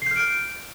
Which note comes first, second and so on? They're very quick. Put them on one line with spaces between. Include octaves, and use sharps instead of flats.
C7 G6 F6 D7